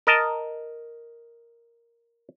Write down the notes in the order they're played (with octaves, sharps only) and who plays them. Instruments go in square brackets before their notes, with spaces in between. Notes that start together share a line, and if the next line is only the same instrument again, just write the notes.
[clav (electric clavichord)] A#4 D#5 A5